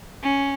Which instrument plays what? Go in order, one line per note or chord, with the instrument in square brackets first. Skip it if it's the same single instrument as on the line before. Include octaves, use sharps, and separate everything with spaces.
[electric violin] C#4